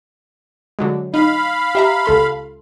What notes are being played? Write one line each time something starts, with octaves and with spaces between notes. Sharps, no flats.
D3 F#3 G#3
D#4 F5 B5
G4 E5 A#5
C#2 A4 C6